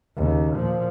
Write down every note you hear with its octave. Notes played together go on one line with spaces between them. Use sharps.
D#2 C#3
A#2 F3